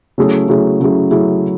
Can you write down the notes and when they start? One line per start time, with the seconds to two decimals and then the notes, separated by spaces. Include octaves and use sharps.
0.18 C#3 F#3 A3 E4 G#4
0.48 C#3 F#3 A3 E4 G#4
0.80 C#3 F#3 A3 E4 G#4
1.11 C#3 F#3 A3 E4 G#4